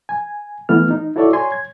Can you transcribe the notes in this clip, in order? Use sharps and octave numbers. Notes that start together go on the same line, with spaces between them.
G#5
E3 A3 B3 F6
D#4
E4 F#4 A4 C#5 D5 E5
C#5 G#5 C6
G#6